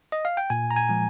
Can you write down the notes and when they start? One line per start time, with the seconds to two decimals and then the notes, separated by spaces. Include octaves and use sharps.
0.12 D#5
0.25 F5
0.37 G5
0.50 A#2 G#5
0.71 A#5
0.76 G#5
0.89 F3 G#3